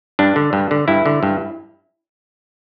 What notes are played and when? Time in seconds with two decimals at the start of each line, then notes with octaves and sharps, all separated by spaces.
0.19 G2 D4
0.36 D3
0.53 G2
0.71 D3
0.88 G2 E4
1.06 D3
1.23 G2